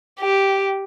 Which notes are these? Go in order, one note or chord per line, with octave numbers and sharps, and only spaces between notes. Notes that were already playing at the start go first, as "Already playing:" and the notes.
G4